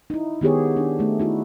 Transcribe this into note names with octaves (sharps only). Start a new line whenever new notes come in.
D#4 E4
D#3 B3 G4 G#4 C#5
D4
A3 D#4
D#4 E4 F#4